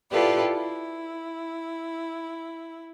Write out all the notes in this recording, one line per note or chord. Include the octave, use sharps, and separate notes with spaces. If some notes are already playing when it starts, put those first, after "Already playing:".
E4 F4 G4 A4 B4 D5
E4